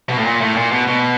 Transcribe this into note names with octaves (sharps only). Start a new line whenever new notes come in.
B2
A2
A#2
A2
A#2
B2
B2